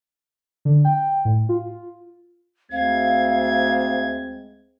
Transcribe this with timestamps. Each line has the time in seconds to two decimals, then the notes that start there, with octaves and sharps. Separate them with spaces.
0.65 D3
0.85 G5
1.25 A2
1.49 F4
2.72 D2 G#3 C4 F5 G#6